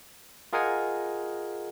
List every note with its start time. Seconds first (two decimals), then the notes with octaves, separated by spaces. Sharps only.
0.53 F4 G#4 A#4 D#5 F#5 G#5